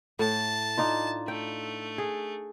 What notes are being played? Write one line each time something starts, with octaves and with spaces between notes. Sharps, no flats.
A2 A5
D4 D#4 F4
A3 G5
G#4